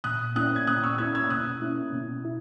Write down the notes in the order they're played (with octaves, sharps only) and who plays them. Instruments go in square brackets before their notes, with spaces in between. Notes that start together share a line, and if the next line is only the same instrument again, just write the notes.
[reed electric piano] A#2 [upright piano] D#6 F#6
[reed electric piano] A#3 C#4 E4 [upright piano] D#6 F#6
[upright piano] G#6
[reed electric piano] A#2 [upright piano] D#6 F#6
[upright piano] C#6 E6
[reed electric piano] A#3 C#4 E4 [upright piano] E6 G#6
[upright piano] E6 G#6
[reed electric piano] B2 [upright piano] D#6 F#6
[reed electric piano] A#3 C#4 E4
B2
E4